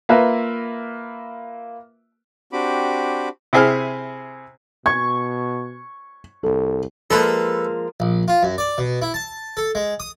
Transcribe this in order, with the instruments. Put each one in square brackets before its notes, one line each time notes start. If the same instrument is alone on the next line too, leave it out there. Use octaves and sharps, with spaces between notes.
[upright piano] A#3 F4 A#4 B4 E5
[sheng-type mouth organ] C4 D4 F#4 G4 B5 D6
[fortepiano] C3 E4 G#4 C5 G#5 F6
[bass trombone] B2 [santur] C#6 [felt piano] G#6
[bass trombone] C2 [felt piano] A4
[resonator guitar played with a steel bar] F3 G#3 A#3 [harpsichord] A4 B4
[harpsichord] A#1
F4
F#2
D5
B2
E4
A5
A4
G#3
D#6